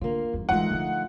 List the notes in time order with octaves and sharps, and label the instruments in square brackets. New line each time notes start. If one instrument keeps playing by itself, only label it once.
[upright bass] D3 [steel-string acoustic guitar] A#3 F4
[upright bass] G1 E2
[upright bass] E3 G#3 [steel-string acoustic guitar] A3 D#4 F4 [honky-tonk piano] F#5
[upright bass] D3 F3